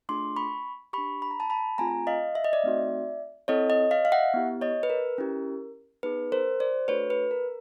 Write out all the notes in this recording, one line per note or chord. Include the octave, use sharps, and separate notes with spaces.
A3 D4 F4 G#4 C6 D6
B5 C#6
D4 G4 B5 C#6
B5
A#5
A5 B5
A5 B5
A3 C4 F4 G#4 G#5 A#5
D#5 F5
E5
D#5
D5 E5
A3 C4 D#4 F#4
C4 E4 A4 C#5 D#5
C#5 D#5
D#5 F5
F5
E5 F#5
B3 E4 G4
C#5 D#5
B4
A#4
C#4 E4 G4
B3 D#4 G#4 B4
A#4 C5
C5 D5
A3 D4 F#4 A4 B4 C#5
B4
A#4